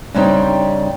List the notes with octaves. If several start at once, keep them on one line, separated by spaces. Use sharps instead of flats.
G2 C#3 G3 C4 D#4